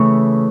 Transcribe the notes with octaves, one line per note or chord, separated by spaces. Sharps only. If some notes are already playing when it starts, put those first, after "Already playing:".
Already playing: C#3 E3 A3 C#5 C#6